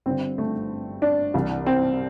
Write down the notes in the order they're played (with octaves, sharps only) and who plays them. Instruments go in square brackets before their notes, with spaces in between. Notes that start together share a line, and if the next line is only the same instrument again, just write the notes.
[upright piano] G1 G2 D3 C4
A3
D4
C2 C3 E3
C4